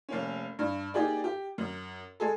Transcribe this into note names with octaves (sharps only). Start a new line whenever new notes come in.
F1 A#3 C#4
G2
A#3 D#4 G4 G#4 D5
G4
F#2
G#3 G#4 A4